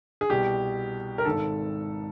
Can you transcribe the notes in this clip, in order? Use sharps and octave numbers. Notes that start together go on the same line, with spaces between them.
G#4
C2 B2 G4
A#4
G#1 G#2 D#3 A4